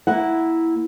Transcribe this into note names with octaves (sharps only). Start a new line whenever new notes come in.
A#3 E4 F#5